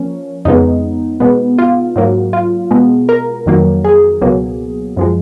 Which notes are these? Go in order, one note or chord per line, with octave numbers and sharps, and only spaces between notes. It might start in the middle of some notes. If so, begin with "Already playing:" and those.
Already playing: F3 A#3 C#4
F2 C#3 G#3 B3 D#4
B2 G#3 B3
F4
G#2 F#3 A#3
F4
B2 G#3 B3
A#4
F2 D#3 F#3 A#3
G#4
C#2 B2 F#3 A#3
F#2 F3 G#3